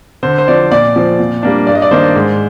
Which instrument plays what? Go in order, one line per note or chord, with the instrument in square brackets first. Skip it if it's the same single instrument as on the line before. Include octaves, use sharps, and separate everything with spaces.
[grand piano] D3 C5
C5
F3 C4 D5
A#2 D5
F3 C4
A#2
G3 A#3 D4
G2 D5
D#5
D5
D#3 A#3 D4 C5
G#2